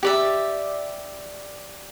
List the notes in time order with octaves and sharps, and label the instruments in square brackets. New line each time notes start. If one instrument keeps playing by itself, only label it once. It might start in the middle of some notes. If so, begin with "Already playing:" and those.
[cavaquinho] G4 D5 E5